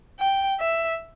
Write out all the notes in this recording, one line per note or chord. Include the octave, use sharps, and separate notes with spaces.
G5
E5